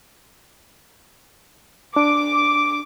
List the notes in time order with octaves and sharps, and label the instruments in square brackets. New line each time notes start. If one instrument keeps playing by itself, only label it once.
[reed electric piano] D4 [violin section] D6